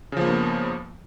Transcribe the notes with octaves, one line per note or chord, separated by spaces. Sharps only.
G2 C#3 F3 A#3 B3